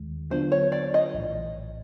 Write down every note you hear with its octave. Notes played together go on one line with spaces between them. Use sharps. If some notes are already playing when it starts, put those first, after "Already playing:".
Already playing: D#2 D#3 G#3
D3 F#3 B3 D4 F4 C5
C#5
D5
D#5
A#1 A2 E3